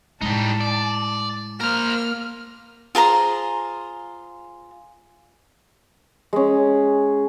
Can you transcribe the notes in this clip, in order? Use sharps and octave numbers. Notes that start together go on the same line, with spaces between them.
A2 G3 G#3 D#4 A5
D5
A#3 A#4 C5 F6
F4 G#4 C5 A#5
G#3 C#4